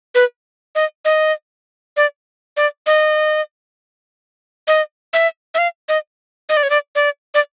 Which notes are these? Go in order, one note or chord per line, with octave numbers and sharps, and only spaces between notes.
B4
D#5
D#5
D5
D5
D#5
D#5
E5
E5
F5
D#5
D#5
D5
C#5
D5
D5
D5